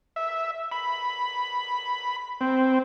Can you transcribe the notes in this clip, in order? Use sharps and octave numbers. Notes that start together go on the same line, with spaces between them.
E5
B5
C4